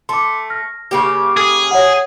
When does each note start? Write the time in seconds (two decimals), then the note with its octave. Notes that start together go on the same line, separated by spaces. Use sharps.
0.09 A3 C6 D6
0.50 F6 A#6
0.91 C#3 A#3 G4
1.37 G#4 A4
1.71 C#5 E5 F#5